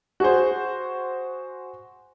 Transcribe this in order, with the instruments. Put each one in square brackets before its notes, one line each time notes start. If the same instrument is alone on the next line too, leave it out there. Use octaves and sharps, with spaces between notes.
[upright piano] F#4 G#4 C5